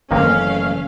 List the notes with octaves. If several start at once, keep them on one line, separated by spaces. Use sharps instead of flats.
F#1 D#3 E3 A3 A#3 C4 C#4 F5